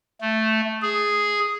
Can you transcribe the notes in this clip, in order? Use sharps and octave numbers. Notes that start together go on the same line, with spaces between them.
A3
G#4